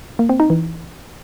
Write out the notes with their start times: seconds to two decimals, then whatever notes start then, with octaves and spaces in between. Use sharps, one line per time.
0.19 A#3
0.29 C4
0.40 D#4
0.50 E3